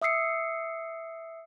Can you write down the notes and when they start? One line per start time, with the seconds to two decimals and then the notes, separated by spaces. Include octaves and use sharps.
0.02 E5 D#6 E6 C7 C#7